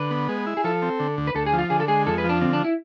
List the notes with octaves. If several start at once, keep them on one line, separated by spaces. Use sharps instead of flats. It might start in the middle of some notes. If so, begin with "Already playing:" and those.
Already playing: D3 B4
B3
G#3
E4
G#4
F3 A4
C4
D3
D2
B4
D2 A4
G#4
F3
F4
D3 G#4
A4
G#3 G#4
F2 A4
B4
F3
D4
D3 C4
D4
E4